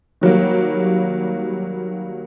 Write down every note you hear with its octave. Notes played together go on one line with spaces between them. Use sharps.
D#3 F#3 G3 A#3